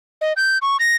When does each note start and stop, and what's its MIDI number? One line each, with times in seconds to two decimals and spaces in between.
0.21 0.33 75
0.37 0.58 91
0.62 0.77 85
0.80 0.96 94